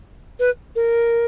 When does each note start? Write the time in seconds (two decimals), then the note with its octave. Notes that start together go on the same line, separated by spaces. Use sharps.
0.39 B4
0.76 A#4